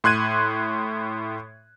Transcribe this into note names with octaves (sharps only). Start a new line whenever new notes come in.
A2 C6 F#6 G#6 D#7